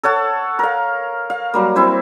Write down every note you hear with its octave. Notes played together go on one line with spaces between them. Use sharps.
A4 C#5 F#5 A5
A#4 F5
F5
F#3 G3 A#3
C4 E4 C5